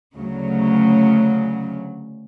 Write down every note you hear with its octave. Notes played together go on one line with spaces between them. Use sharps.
D2 C#3 F#3